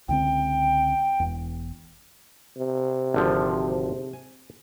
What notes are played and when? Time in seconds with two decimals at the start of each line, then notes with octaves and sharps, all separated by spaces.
0.09 C#2 D3 C4 G5
1.20 E1 E2
2.58 C3
3.14 G#1 D3 F3
4.13 G#5